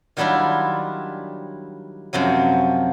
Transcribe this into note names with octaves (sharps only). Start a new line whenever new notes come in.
D#3 F#3 G3 D4 E4 F4
F#2 C3 F3 F#3